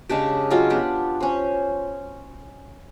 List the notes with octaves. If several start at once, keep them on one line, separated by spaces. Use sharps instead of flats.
C#3 G#3 D4 G4
F#3 G#3 F4 F#4
B3 D4 G4
C#4 C5